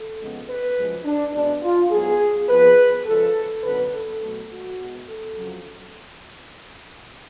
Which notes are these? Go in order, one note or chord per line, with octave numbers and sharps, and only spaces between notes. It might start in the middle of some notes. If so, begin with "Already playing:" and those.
Already playing: A4
F2 C#3 G#3 B3
B4
F#2 C#3 F3 G#3
D4
B2 G#3 B3 D4
F4
G#2 F#3 B3 G#4
F2 F3 B3 B4
C#3 F3 G#3 A4
F#2 D3 F#3 B3 B4
A4
B2 F#3 A3
F#4
B2 G#3 B3
A4
F2 C#3 F#3